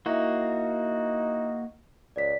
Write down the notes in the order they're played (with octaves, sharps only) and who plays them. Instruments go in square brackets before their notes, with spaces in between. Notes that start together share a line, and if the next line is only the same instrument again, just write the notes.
[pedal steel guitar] A#3 F#4 [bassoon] D#4 [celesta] E4 E5
[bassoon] C#2 [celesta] D5 B6